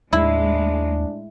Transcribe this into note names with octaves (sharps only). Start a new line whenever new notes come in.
D#2 A2 G#3 D4 E4